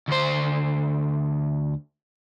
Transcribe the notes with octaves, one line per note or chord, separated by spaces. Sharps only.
D2 C5